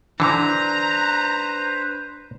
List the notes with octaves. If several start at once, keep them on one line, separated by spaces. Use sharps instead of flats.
D3 E3 D4 B4 C5 A#5